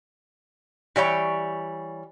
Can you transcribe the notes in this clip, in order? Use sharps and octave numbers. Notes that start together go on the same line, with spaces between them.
E3 G3 C#5 G5